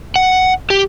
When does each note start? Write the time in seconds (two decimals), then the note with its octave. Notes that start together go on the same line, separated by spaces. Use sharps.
0.16 F#5
0.70 G4